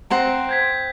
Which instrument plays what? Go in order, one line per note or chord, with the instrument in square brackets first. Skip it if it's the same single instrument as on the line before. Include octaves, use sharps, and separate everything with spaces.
[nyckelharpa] C4 [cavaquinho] C5 F#5 A#5
[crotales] G6 G#6 B6